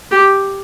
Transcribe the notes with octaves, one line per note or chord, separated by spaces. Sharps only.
G4